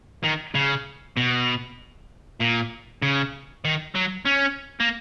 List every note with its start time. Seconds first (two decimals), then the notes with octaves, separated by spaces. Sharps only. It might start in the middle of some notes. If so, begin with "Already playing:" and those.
0.24 D#3
0.55 C#3
1.17 B2
2.40 A#2
3.02 C#3
3.65 D#3
3.95 F#3
4.27 C#4
4.80 A#3